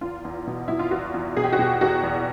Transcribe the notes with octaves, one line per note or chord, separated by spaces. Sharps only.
E2 F4
E2
B2
B2 E4
F4
E2 F#4
E2
B2 G#4
G4
F#4
B2 G4
E2 F#4
E2